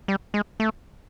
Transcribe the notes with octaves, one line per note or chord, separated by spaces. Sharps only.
G3
G#3
A3